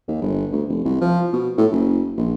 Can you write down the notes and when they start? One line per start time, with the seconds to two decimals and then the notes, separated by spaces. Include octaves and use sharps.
0.08 D#2
0.22 G1
0.52 D2
0.69 F1
0.85 C2
1.01 F3
1.33 B2
1.58 A2
1.71 F#1
2.17 A#1